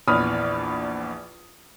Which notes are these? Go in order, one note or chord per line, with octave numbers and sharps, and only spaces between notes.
A#1 E2 B5 D#6 F6